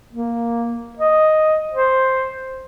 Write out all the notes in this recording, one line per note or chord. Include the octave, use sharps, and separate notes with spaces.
A#3
D#5
C5